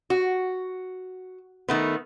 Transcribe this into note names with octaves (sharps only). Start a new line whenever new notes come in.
F#4
D#3 A3 B3